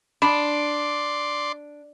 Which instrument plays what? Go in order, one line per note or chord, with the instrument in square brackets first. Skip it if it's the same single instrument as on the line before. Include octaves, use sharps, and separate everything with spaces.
[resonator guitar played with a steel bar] D4 [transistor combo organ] D5 C6 [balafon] B5